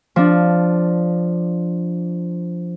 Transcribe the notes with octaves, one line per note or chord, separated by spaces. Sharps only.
F3 D4